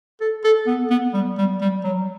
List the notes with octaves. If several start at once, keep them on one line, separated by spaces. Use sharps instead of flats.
A4
A4
B3
B3
G3
G3
G3
F#3